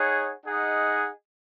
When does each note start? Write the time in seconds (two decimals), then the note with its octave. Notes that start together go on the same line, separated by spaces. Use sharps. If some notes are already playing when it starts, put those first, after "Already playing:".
Already playing: D#4 G#4 C#5 F#5
0.46 D#4 G#4 D#5 F#5